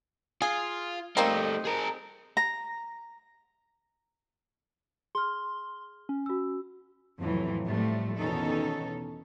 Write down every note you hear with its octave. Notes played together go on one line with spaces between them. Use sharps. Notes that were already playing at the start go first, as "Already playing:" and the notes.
F4 G#4
G3 A3 A#3 C4 D#4
G#4 A#4
A#5
G#4 C6 F6
C#4
F#4 E6
F2 A2 C3 E3 F#3
A2 F3 G3 A3
E2 B2 D#3 C#4 D#4 A4